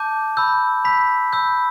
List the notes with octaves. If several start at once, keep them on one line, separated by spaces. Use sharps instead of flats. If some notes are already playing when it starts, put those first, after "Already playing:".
Already playing: A5 D6 G6
B5 E6 G6
B5 E6 G6 B6
B5 E6 G6